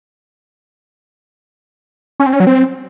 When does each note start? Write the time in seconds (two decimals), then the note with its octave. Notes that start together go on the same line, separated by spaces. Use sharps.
2.20 C#4
2.26 C4
2.33 C#4
2.40 F#3
2.47 C4